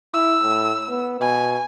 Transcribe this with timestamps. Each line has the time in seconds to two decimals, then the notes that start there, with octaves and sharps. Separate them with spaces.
0.14 E4 E6
0.43 A2
0.89 B3
1.21 B2 G#5